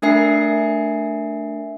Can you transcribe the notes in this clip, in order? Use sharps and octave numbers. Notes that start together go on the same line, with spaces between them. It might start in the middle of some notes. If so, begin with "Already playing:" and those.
A3 D4 A#4 E5 G#5 C7